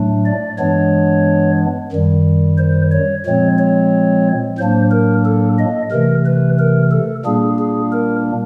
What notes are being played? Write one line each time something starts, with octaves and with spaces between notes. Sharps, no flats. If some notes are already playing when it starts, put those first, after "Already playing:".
Already playing: A2 F#3 A3 D4
D5
G2 E3 G#3 B3 D4 C#5
F#2 D#3 G3
C5
C#5
A#2 F3 G#3 C4 C#5
C#5
A2 F#3 A#3 D4 C5
A#4
A4
D#5
C3 E3 A3 A#4
B4
A#4
A4
A#2 G3 A#3 D4 G#4
G#4
A#4